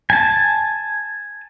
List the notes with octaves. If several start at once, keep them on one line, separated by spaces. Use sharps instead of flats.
G#5 A5